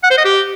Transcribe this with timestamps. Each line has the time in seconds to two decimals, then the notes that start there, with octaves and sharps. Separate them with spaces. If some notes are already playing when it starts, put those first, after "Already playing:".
0.03 F#5
0.11 C5
0.18 D#5
0.25 G4